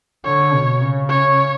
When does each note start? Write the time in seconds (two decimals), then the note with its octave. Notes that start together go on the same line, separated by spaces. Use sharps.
0.25 D3 C#5
0.54 B2
0.82 C#3
1.09 C#5